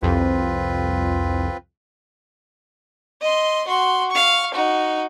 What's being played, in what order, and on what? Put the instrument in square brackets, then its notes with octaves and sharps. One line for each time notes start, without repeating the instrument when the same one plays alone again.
[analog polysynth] C2 F2 [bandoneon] C4 F4 B4
[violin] D#5 C6
F#4 C6
F5 C#6
D#4 F#4